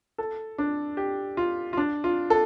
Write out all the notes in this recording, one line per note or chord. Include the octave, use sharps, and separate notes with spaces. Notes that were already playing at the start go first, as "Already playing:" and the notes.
A4
D4
G4
F4
F4
D4
F4
A4